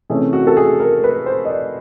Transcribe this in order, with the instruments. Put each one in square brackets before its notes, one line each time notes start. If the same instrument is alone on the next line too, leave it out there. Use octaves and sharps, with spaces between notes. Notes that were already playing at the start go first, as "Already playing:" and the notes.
[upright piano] C3 E3 A3 C#4 G#4
F#4
A4
G#4
A#4
B4
C5
D#5
D5